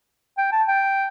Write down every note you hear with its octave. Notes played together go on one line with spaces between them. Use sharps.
G5
A5
G5